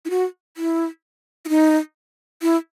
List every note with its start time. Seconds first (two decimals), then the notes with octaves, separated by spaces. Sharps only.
0.05 E4
0.10 F#4
0.57 E4
1.45 E4
1.49 D#4
2.42 E4